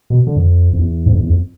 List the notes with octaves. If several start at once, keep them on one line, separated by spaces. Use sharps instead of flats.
B2
D3
F2
F2
E2
G#2
F2
E2
F2